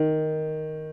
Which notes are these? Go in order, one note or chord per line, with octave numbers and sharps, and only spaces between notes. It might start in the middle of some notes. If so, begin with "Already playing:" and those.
Already playing: D#3